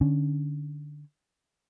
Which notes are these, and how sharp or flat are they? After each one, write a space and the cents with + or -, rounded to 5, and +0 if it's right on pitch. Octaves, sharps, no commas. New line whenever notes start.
D3 +15 C#4 +10